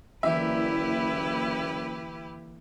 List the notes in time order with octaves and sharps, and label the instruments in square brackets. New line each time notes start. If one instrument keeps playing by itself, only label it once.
[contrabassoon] F#1 [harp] D3 E3 A#3 [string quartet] E4 G4 B4 [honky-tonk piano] E5